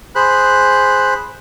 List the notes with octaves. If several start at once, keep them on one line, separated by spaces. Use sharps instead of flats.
G#4 C5 B5 F#6